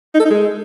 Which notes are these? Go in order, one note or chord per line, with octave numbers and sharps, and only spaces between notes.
D#4
A4
D#4
G#3